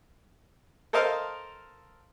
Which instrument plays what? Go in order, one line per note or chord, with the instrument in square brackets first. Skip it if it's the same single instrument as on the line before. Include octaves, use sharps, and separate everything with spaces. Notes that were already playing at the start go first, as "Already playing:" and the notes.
[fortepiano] A4 A#4 C5 D#5 F5